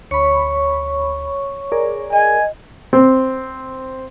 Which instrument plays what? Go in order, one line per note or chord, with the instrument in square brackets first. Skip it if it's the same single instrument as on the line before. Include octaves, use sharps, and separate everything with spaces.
[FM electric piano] D2 B5 [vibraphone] C#5 C#6
[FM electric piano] G#4 A#4 D5
[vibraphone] D#5 [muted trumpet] G#5
[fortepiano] C4